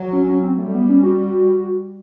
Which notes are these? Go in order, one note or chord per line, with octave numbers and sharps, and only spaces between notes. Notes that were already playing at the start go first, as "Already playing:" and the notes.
Already playing: F#3
C#4
C#4
C4
G3 A3
B3
C#4
F#4